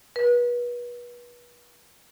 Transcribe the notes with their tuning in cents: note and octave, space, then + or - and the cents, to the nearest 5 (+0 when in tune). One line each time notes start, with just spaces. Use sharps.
B4 -35